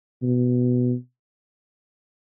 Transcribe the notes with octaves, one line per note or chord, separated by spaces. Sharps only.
B2